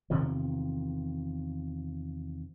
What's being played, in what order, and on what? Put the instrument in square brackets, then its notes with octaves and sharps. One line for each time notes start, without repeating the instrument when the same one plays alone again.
[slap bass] E2 C3 D#3 F3